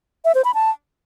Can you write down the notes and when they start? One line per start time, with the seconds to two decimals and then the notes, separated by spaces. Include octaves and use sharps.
0.25 E5
0.35 C5
0.44 B5
0.54 A5